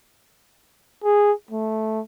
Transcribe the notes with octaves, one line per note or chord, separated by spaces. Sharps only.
G#4
A3